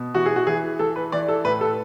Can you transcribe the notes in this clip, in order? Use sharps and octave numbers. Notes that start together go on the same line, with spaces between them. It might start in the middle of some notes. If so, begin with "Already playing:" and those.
Already playing: B2
E3 F#4
G#4
F#4
E3 G#4
E3 A4
B4
E3 D5
A4
A2 B4
A4